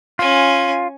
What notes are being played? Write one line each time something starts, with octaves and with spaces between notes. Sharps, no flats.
C#4 F4 G#5